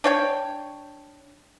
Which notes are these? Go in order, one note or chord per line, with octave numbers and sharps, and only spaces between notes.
D4 C#5 G5